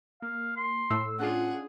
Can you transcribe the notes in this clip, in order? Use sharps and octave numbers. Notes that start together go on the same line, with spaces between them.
A#3 F5
C6
A2 E6
C#4 D4 F4 G#4 F#5